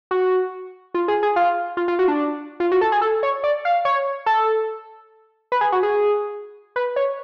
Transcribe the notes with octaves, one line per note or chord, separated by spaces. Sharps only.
F#4
F4
G#4
G#4
F4
F4
F4
F#4
D4
F4
F#4
A4
G#4
A4
C#5
D5
F5
C#5
A4
B4
G#4
F#4
G#4
B4
C#5